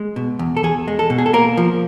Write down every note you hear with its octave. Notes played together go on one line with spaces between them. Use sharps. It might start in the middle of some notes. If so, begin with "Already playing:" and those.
Already playing: G#3
B2
E2
A4
E2 G#4
G#3
A4
B2
G#4
A4
A#3 A#4
F3